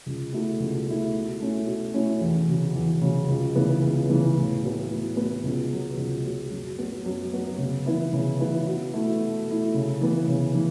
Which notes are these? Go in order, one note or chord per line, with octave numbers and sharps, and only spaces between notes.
C#2
B2 A3 E4
C#2
B2 A3 E4
B2
A3 C#4 E4
B2
A3 C#4 E4
E2
C#3 F#3
E2
C#3 F#3
C#2
C#3 E3 B3
C#2
C#3 E3 B3
A2
F#3 B3
A2
F#3 B3
C#2
B2 F#3
C#2
B2 F#3
F#2
F#3 B3 F#4
F#2
F#3 B3 F#4
C#3
E3 B3 E4
C#3
E3 B3 E4
B2
A3 E4
B2
A3 E4
C#3
E3 B3
C#3
E3